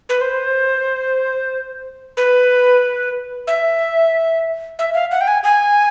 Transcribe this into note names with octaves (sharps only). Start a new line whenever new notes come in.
B4
C5
B4
E5
E5
F5
F#5
G5
G#5
G#5